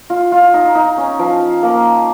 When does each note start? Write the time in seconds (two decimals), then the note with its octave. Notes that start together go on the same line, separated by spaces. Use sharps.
0.10 F4
0.32 F4
0.54 D#4
0.75 D#4
0.97 C#4
1.19 F3
1.63 A#3